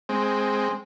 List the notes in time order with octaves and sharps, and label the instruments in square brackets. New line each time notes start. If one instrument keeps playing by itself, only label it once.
[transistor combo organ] G#3 C4